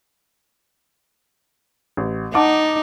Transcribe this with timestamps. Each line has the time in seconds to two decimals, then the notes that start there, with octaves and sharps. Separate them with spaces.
1.97 A1
2.34 D#4 F#5 A5 D6